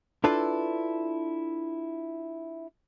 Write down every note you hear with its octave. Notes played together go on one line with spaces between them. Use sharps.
D4 E4 F4 A4 B4 D5